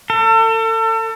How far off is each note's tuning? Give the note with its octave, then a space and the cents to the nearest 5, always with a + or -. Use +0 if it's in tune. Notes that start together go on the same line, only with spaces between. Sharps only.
A4 +35